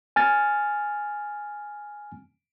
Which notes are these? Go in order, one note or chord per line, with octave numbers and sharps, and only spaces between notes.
G#5 F6 A6